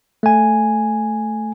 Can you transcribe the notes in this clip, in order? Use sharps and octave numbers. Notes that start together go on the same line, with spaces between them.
A3 G#5